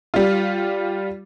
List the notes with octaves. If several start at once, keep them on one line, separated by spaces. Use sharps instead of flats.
G3 F4